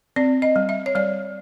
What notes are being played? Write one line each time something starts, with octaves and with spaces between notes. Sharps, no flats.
C4 D5
D#5
G3
E5
C#5
G3 D5